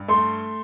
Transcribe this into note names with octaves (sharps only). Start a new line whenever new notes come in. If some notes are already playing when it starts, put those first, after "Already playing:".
Already playing: G2
A3 C6